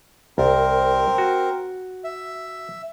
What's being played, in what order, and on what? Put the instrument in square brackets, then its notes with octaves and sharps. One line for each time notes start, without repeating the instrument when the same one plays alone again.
[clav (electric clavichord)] C2 [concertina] C4 A#4
[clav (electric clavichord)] F#4
[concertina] E5